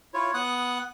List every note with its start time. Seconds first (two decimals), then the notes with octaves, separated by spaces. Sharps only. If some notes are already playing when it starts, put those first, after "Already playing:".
0.14 E4 F4 C#5
0.34 B3 F#5 D#6 F#6